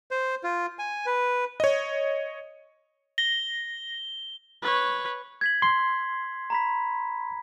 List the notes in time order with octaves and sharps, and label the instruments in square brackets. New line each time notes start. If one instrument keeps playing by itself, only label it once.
[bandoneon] C5
F4
G#5
B4
[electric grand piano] C#5 D#5
[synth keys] A#6 [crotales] G7
[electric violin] B4 C#5
[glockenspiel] G#6 B6 F#7
[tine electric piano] C6
[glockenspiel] A#5 B5 B6